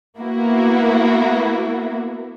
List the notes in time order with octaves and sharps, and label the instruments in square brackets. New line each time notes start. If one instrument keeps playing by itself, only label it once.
[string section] A#3 B3 E4 F#4